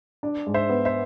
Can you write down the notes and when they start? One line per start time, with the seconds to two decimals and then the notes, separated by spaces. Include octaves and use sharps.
0.23 D4
0.47 G#2
0.54 C5 E5
0.69 B3
0.85 C5 E5